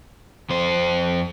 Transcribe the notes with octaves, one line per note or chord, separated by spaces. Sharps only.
F2 C5